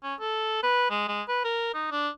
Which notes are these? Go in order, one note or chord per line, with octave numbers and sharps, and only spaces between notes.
C#4
A4
B4
G#3
G#3
B4
A#4
D#4
D4